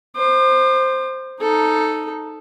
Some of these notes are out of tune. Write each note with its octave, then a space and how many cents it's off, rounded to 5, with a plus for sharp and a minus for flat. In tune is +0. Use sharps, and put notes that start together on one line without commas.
C5 +0 D6 +45
D#4 +0 A4 +0